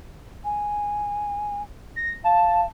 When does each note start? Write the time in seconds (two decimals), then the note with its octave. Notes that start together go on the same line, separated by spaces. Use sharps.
0.45 G#5
1.96 A#6
2.24 F5 A5